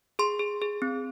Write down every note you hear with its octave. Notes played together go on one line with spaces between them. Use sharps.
G#4 C6
G#4
G#4
C4